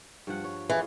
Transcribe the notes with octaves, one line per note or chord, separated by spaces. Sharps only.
G2 F3 F#5
C#5
E3 A3 F4 G#4